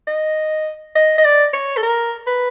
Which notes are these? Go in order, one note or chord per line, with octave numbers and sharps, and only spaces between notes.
D#5
D#5
D#5
D5
C#5
A4
A#4
B4